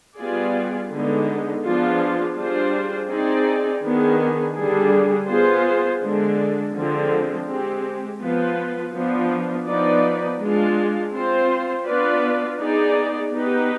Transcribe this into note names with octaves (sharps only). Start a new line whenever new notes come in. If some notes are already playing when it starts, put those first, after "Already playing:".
G3 B3 F4 G#4 D5
D3 G#3 B3 D#4
F3 B3 D4 F4 G#4
G3 D4 F4 G#4 C5
C4 D#4 G#4 D5
D#3 B3 D4 G#4
D3 G3 D4 G#4
B3 F4 G#4 C5
D3 G#3 D4
D3 F3 G#3 C4
G#3 C4 G4
F3 B3 F4 B4
F3 B3 D4 F4
F3 B3 D#4 B4 D5
G#3 D4 F4
C4 F4 C5
B3 D4 F4 B4 D5
B3 D#4 G#4 D5
B3 D#4 G4 B4